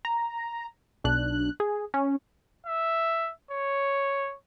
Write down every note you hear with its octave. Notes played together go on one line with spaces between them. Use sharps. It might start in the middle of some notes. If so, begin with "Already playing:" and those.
A#5
B1 D4 F#6
G#4
C#4
E5
C#5